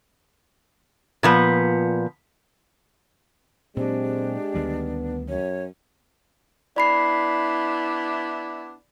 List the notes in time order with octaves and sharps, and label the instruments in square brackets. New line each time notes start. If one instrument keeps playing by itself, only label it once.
[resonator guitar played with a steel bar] A#2 F3 B3
[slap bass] A#2 F#3 [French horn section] G#3 G4 [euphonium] C4 [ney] D4
[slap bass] D2 D#3 G3 [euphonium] B3
[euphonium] F#2 [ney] C#5
[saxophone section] B3 D4 E4 [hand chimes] D5 B5 C7